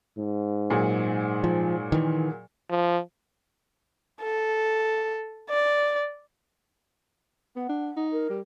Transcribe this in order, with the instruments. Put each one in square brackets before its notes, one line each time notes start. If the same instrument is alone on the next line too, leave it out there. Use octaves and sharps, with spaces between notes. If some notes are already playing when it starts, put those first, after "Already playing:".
[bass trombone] G#2
[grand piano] A#2 F#3 G#4
[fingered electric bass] F3
D#3 E3
[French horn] F3
[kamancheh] A4
D5
[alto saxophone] B3 [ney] F#5
[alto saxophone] D4
D#4
[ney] A#4
[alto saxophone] G3